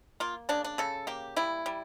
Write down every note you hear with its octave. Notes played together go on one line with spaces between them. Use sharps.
A#3 F4
C#3 D4
D4
C#3 A4
A#3 G4
G3 E4
G3